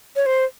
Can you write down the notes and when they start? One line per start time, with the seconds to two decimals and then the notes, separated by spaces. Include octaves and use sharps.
0.16 C#5
0.26 C5